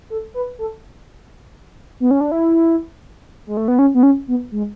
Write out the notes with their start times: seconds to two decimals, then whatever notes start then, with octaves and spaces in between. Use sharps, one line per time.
0.10 A4
0.34 B4
0.59 A4
2.00 B3
2.11 C#4
2.21 D4
2.31 E4
3.47 G#3
3.57 A3
3.68 B3
3.79 C#4
3.94 B3
4.03 C#4
4.28 B3
4.52 G#3